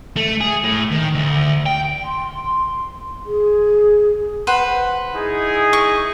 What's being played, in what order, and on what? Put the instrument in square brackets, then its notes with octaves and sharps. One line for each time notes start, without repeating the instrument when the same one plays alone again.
[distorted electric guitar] A3
G#4
A2
D#3
D2
G5
[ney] C6
G#4
[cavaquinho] B4 C5 F#5
[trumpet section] D#4 E4 G#4
[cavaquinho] C#6